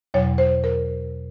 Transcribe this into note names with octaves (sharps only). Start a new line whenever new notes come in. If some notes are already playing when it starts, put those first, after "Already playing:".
E2 B2 F#3 C#5
C5
A#4